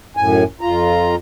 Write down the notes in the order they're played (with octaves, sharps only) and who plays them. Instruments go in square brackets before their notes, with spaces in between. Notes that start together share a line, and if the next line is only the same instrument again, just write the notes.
[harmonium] F#2 A2 G#5
F2 F4 A#5